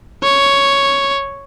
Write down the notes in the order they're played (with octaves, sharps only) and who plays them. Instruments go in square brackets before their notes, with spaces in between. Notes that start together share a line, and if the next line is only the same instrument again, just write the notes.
[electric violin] C#5